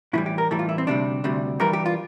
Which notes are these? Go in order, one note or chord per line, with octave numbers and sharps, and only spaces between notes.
A2 E3 G3 E4
G4
A#4
A2 E3 G3 A4
F4
E4
C4
D2 C3 G3 D4
D2 C3 G3
G2 E3 G3 A#4
G4
F4